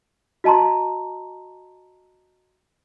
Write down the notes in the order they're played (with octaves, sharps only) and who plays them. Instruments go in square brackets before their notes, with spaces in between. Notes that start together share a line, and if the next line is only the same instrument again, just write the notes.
[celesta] F#4 D#5 A5 A#5 C6